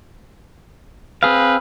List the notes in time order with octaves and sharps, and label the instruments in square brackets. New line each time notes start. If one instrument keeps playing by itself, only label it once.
[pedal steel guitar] C4 G#4 F5 [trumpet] B4